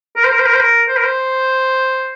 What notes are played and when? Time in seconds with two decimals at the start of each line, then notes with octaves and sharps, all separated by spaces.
0.16 A#4
0.24 C5
0.31 A#4
0.39 C5
0.46 A#4
0.53 C5
0.60 A#4
0.88 C5
0.97 A#4
1.04 C5